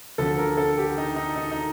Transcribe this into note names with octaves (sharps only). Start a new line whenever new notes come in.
D2 D3 F3 A4
A#4
A4
G4
D#4
D#4
D#4
D#4